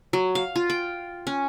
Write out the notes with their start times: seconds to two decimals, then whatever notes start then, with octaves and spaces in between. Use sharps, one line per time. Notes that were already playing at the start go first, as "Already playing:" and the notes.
0.13 F#3
0.35 F5
0.56 F4
0.70 G5
1.27 C#4